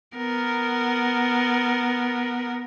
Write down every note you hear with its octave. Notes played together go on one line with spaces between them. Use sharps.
B3 A#4